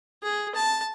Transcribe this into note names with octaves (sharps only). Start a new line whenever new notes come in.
G#4
A5